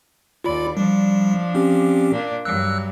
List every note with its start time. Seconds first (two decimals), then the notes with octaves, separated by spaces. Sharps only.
0.44 D#2 F4 D5 B5
0.77 F3 G3 D4
1.55 C4 C#4 G4
2.11 A#2 D4
2.45 G2 F#3 E6 F#6